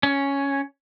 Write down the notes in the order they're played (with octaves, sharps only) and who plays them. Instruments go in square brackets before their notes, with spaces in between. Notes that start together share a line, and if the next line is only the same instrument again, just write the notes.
[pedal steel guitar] C#4